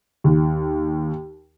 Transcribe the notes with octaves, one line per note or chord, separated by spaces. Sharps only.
D#2